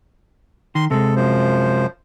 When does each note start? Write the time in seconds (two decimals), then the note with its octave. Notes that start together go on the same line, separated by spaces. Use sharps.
0.75 D#3 C6
0.91 C3 G#3 A4
1.16 F#2 F3 C5